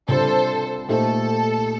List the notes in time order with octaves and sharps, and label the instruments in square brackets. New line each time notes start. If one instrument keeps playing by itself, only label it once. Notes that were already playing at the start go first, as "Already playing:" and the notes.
[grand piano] C3 G3 D4 F4 [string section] A4 C5
[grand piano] A#2 A3 D#4 G4 C5 [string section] A4